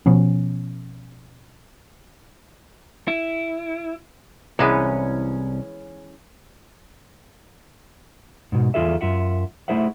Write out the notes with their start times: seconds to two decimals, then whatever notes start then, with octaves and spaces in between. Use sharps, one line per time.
0.06 B2 F3 B3 C#4
3.08 E4
4.59 C2 E3 G#3 B3 C#4
8.52 G#2 B2
8.74 E2 D3 F4 G#4 A4 E5
9.01 F#2 F4 E5 F#5
9.68 A3 E4 G#4 C5 E5 F#5